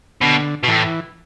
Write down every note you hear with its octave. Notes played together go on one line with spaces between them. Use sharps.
B2 D3
B2
A2 E3